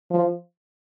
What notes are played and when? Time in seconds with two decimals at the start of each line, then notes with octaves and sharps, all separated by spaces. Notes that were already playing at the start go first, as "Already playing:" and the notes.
0.10 F3